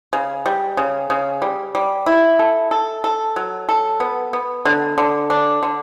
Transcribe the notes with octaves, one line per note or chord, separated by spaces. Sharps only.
C#3
G3
C#3
C#3
G3
G3
E4
A4
A4
A4
F#3
A4
B3
B3
D3
D3
D4
D3